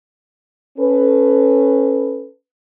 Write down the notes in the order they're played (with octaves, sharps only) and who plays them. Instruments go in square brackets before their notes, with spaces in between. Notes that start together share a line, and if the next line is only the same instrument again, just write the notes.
[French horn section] C#4 A4 B4